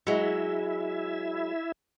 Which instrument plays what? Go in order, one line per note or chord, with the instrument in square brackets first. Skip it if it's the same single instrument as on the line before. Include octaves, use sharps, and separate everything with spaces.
[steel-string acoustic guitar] F#3 G#3 [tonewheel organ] E4 E5